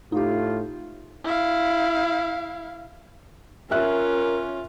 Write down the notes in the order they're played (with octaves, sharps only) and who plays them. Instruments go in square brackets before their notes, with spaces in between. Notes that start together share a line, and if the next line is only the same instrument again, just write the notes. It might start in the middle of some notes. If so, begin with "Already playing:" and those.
[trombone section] A2 A3 F4 [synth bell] D#4 G4
[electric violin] E4 F5
[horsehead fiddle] C#4 [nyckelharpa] F4 [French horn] A#4 [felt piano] E5 F#6